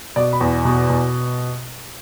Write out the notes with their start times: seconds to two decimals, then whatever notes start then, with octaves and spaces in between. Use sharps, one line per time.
0.16 B2 D5
0.33 B5
0.41 E2
0.65 B2
0.90 B2